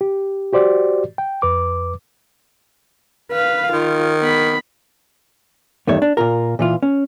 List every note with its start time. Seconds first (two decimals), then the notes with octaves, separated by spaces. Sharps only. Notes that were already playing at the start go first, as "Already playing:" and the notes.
0.01 G4
0.53 F#4 G4 C5 D5
1.18 G5
1.42 F2 B4 D6
3.31 B4 F5
3.73 D#3 F4
4.21 B3 B5
5.87 E2 G2 D#3 A3 C#5
6.02 D4
6.17 A#2 F4 A#4
6.59 A#2 E3 F4
6.83 C#4